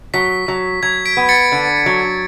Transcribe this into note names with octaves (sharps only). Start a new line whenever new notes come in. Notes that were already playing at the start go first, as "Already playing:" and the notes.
F#3 B6
F#3
F#3 G#6
B6 D7
B3
A6 C#7
D3
F#3